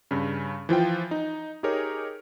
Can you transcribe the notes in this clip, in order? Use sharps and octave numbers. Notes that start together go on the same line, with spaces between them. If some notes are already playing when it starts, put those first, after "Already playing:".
G2 C#3
E3 F3 F4 G5
D#4
D#4 G4 G#4 A#4 C#5